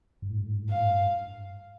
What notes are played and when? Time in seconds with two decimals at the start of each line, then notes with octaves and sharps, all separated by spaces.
0.22 G2
0.30 A2
0.38 G2
0.45 A2
0.54 G2
0.62 A2
0.69 G2 F5
0.77 A2
0.85 G2